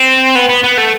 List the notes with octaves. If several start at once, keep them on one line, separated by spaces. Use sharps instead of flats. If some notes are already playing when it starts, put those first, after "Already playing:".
Already playing: C4
B3
B3
B3
A3